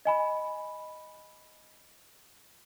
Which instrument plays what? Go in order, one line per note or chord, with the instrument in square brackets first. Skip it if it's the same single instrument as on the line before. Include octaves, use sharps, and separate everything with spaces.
[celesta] D#5 G#5 B5